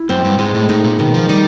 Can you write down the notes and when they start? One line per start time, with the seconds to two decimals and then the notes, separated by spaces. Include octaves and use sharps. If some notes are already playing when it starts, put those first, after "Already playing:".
Already playing: E4
0.09 F#2 C4
0.24 G2
0.38 G#2 G#3
0.55 A2
0.69 A2 D#4
0.84 A#2
0.99 B2 D#3
1.14 F3
1.29 G3 D#4